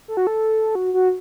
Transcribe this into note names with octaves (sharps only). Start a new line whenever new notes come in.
A4
F#4
A4
F#4
F#4